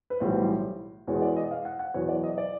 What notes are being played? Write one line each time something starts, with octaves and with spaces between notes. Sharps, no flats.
B4
B1 A2 E3 G3 C5
E2 B2 G#3 C#5
D5
D#5
F5
F#5
F#5
E2 B2 F#3 C#5
D5
D#5
D5